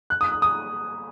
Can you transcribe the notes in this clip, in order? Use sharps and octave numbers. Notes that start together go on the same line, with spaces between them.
F#6
D#6
D#6
D#6